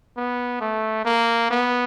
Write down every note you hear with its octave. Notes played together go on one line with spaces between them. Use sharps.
B3
A3
A#3
B3